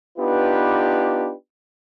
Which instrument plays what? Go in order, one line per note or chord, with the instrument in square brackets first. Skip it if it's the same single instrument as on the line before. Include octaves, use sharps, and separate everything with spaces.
[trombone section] B3 D4 D#4 F4 G4 B4